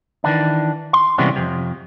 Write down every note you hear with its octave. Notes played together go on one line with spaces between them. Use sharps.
D#3 E3 D4
C6
C3 E3 G3 G#3 B3 C#4
F2 C3